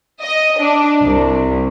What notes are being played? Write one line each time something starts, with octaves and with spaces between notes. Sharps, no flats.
D#5
D4
C2